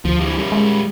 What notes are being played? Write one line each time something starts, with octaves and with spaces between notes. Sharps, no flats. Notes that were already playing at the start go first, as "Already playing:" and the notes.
D2 F3
E3 G3
G3 C#4
G#3